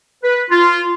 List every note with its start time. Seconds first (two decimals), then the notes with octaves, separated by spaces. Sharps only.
0.24 B4
0.50 F4